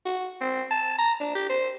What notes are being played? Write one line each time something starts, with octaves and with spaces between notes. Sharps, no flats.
F#4
C4
A5
A#5
D4
G4
C5